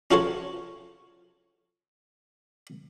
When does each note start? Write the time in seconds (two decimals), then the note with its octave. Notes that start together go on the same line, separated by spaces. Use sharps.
0.11 C#4 F4 F#4 A4 C5 C#5